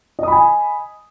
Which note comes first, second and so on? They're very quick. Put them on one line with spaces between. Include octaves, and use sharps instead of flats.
D#5 D#6 B5 G#5